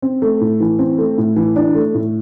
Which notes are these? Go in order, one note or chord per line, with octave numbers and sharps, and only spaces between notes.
C4
A3
A2
E3
C4
A3
A2
E3
D4
A3
A2